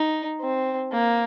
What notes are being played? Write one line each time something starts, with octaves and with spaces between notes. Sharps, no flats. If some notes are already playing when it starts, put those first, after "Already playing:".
Already playing: D#4
C4
A#3